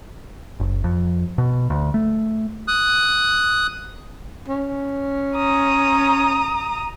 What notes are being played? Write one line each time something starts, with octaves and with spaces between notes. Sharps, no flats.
F#1
F2
B2
D2
A3
D#6 F#6
C#4
A#5 D#6